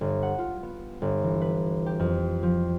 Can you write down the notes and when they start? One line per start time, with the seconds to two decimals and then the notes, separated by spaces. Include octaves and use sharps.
0.01 G1
0.23 F#5
0.38 F4
0.63 B3
1.02 G1
1.24 E3
1.41 B4
1.86 G4
1.99 F2
2.43 F3